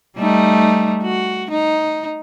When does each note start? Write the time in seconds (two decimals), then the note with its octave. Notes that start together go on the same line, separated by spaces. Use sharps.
0.17 G3 A3 D#4
1.03 F#4
1.51 D#4